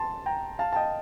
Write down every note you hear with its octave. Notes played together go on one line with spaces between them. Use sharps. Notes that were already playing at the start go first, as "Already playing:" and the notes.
Already playing: A5 C6
G5 A#5
F5 A5
A5
D#5 G5